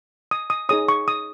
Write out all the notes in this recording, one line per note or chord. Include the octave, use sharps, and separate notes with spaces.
D#6
D#6
D#4 G#4 C#5 D#6
C#6
D#6